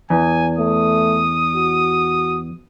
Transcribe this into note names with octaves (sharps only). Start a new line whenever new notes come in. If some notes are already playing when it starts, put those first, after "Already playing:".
E2 G#5
A3 D#6
F#4